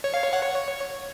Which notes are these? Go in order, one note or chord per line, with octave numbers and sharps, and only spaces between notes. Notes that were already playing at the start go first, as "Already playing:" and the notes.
C#5
F5
C#5
F#5
C#5